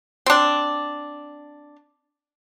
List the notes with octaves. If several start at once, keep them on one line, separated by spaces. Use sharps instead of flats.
C4 D4